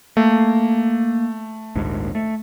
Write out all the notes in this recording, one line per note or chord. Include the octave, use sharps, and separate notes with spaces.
A3 A#3
A#1 D#2 G#2
A3